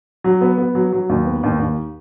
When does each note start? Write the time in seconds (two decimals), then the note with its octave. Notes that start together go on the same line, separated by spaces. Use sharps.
0.24 F#3
0.41 B3
0.58 B3
0.75 F#3
0.92 F#3
1.09 D#2
1.26 B3
1.43 D#2
1.60 D#2